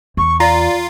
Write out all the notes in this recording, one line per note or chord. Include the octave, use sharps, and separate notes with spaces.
E2 C#6
F4 D5 A#5